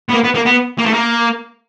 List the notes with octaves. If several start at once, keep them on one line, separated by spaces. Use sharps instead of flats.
B3
A#3
B3
A#3
B3
A#3
A3
A#3